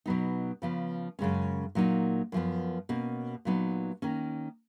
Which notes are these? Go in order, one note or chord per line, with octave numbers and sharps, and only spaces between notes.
B2 F#3 B3 D#4
C#3 F3 B3
F#2 C#3 G#3 C#4
A#2 F#3 A#3 D#4
F#2 F3 B3
B2 A#3 C#4
A#2 F#3 B3 D#4
D#3 A#3 C#4